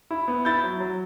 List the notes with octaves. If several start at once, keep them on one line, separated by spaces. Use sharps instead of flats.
E4
B3
E4 G6 A6
F#3
F#3